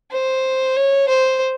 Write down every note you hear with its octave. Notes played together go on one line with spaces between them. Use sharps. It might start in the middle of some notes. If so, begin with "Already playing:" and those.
C5
C#5
C5